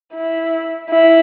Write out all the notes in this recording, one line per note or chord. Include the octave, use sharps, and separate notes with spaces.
E4
E4